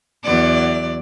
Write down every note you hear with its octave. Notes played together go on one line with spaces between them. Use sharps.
E2 F#3 D5